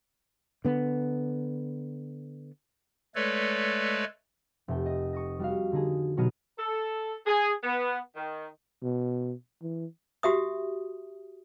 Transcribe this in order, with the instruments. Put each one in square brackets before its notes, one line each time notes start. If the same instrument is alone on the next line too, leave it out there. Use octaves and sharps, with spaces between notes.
[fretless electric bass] D3 B3
[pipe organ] G#3 A3 A4 B4 C#5 D5
[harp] F1 E5 G5
D#5
C#6 D#6 A#6
G3 F#4 F5
D3 D#4 G#4
B2 F#3 B3 D#4 F6 D#7
[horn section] A4
G#4
B3
D#3
[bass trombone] B2
E3
[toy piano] F#4 G4 E5 D#6